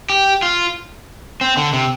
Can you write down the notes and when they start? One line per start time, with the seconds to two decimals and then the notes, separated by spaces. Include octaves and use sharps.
0.10 G4
0.42 F4
1.41 C4
1.57 D3
1.73 C3